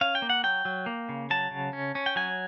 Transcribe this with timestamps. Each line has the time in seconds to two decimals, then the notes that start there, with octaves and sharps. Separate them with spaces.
0.01 C#4 F5
0.15 G5
0.22 A#3
0.30 F#5
0.44 F#3 G5
0.65 F#3
0.86 A#3
1.09 C#3
1.31 F#3 A5
1.51 C#3
1.73 C#4
1.95 C#4
2.06 G5
2.16 F#3 G#5